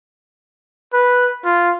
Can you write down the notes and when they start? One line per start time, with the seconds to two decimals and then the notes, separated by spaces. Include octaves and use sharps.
0.93 B4
1.45 F4